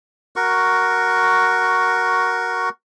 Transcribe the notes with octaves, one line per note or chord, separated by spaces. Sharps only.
F#4 A#4 C#6